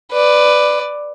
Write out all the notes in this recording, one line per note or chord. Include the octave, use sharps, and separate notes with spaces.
B4 D5